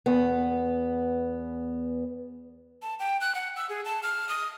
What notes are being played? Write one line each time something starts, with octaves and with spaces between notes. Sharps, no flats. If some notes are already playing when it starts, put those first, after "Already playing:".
E2 B3
A5
G5
F#6
F#5
E6
G#4
A5
F6
D#6